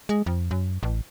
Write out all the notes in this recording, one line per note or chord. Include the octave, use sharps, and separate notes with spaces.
G#3
F2
F#2
A1